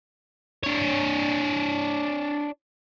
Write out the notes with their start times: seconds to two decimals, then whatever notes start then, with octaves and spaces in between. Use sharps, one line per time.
0.63 D4 C#5